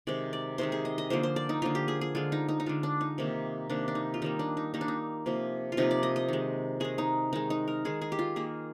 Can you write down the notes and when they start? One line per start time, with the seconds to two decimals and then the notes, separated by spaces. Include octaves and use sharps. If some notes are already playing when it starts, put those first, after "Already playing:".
0.07 C3 D#3 G#3 D5
0.33 D5
0.58 C3 D#3 G#3 C5
0.72 G#4
0.85 D#5
0.98 D#5
1.10 D3 F3 A#3 C5
1.23 C5
1.36 D5
1.49 D#4
1.62 D3 F3 A#3 F4
1.75 G4
1.88 G#4
2.01 G#4
2.15 D3 G#3 F4
2.32 D#4
2.48 D#4
2.60 D#4
2.66 D3 G#3 F4
2.83 D4
3.01 D#4
3.18 C3 D#3 A#3
3.70 C3 D#3 A#3 D4
3.88 D4
3.95 D#4
4.14 F4
4.22 D#3 G3 A#3 D#4
4.39 D4
4.57 D#4
4.74 D#3 G3 A#3 D#4
4.81 D4
4.88 D#4
5.26 C3 F3 A#3
5.72 F4
5.77 C3 F3 A#3 D#4
5.91 D5
6.03 D#5
6.16 D#5
6.28 D#3 G#3
6.80 D#3 G#3 G#4
6.98 D#4
7.33 D#3 G#3 D#4
7.50 D#4
7.68 A#4
7.85 D#3 G#3 G#4
8.01 G#4
8.12 G4
8.19 F4
8.36 D#3 A#3 G#4